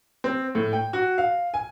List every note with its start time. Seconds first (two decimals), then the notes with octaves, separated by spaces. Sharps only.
0.24 C4
0.55 A2
0.73 G5
0.93 F#4
1.18 F5
1.54 G#5